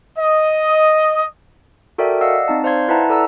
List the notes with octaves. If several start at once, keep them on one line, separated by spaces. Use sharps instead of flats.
D#5
F#4 A4 A#4 D5 E5 G5
D5 D#5 F5 F#5 E6
C4 D#4 A5
C5 D5 F5 C6 G#6
E4 B4 E5 F#5 A5 A#5
A4 D5 F#5 A#5 E6